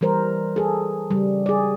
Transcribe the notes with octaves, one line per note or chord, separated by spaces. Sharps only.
E3 G3 A#4 C5
G#4 A4
C#3 G3
G#4 D5